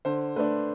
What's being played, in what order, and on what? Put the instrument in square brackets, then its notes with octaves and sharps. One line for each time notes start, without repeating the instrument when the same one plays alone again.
[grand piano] D3 C5
A3 D4 B4